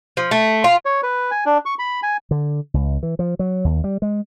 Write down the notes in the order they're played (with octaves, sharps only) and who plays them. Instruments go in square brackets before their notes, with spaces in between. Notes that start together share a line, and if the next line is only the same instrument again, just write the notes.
[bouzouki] F3
A3
F4
[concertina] C#5
B4
G#5
D4
C#6
B5
G#5
[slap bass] D3
C#2
E3
F3
F#3
D#2
G3
G#3